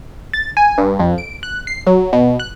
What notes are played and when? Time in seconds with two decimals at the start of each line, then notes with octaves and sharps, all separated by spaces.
0.34 A6
0.57 G#5
0.78 G2
1.00 F2
1.18 D7
1.43 F#6
1.67 C7
1.87 F#3
2.13 B2
2.40 F#6